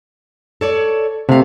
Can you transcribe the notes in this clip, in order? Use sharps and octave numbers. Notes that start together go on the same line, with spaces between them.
A4 C#5 D5
C3 A3 F5